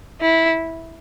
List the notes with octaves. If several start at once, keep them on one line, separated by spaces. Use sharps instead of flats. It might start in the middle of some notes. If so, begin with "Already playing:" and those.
E4